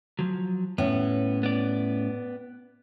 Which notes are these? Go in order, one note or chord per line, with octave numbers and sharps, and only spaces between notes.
F3 F#3
A2 B3 C#4
B3 D5